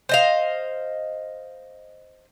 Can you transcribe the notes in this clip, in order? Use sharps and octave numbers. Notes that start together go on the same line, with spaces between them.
C5 D#5 F5